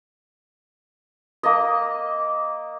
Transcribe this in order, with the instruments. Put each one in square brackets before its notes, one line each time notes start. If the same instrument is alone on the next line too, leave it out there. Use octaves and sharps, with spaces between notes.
[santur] A#3 D#5